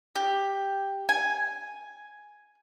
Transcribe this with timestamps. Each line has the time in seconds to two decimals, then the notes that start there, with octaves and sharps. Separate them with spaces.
0.15 G4
1.09 G#5